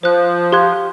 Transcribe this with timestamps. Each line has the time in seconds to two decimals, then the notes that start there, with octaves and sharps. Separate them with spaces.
0.03 F3 C5 F#6
0.52 G4 F5 C6 F#6 G#6